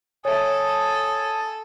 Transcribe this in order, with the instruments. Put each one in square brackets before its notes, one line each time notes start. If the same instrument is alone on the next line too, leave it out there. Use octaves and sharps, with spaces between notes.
[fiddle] A4 [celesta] C#5 E5 [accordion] G#5 A5 D#6